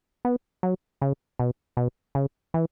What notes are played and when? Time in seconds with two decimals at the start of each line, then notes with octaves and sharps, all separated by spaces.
0.25 B3
0.63 F#3
1.02 C#3
1.39 B2
1.77 B2
2.15 C#3
2.54 E3